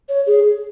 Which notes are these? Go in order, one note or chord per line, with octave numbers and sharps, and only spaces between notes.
C#5
G#4